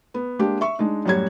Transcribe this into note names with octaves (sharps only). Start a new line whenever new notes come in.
B3
G#3 A#3 D4 G4
E5 C#6
G#3 D4 D#4
F#2 A2 G3 F#4 C#5 G#6